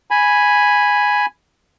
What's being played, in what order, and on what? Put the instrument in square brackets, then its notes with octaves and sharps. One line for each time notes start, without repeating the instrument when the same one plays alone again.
[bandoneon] G#5 B5